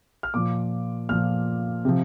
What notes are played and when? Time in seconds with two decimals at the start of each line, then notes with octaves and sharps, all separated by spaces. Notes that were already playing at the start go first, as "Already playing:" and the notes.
0.23 F6
0.34 A#2 F3 D6
1.09 A#2 F3 F6
1.85 C3 F3